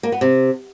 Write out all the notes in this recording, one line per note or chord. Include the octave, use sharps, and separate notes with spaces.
A#3
B3
C3